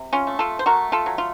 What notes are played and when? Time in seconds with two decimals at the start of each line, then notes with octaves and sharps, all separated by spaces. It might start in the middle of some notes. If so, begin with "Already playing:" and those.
Already playing: C3
0.13 C#4 F4
0.27 A3
0.39 F4 A4
0.59 C5
0.66 A3 F#4 A#4
0.92 F4 A4
1.06 F#3
1.18 F4